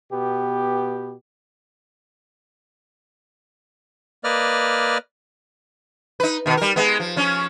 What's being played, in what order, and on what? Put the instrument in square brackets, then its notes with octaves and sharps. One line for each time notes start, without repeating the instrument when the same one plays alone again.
[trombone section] B2 B3 G4
[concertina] A#3 B4 D5 D#5 F6
[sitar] D#4 B4
B2 D#3
G3 A#4
G#3 B3
F3
F3 C#4